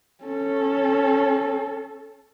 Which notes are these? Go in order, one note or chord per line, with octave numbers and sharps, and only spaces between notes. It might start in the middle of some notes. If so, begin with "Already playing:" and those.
C#4 A4